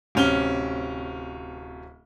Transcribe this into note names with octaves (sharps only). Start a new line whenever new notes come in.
D1 C3 C#4 F6 G7